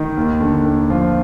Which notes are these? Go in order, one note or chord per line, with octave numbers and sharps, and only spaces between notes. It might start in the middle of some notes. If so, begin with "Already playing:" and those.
Already playing: D#3
D#2
D3
D#2
F3 F4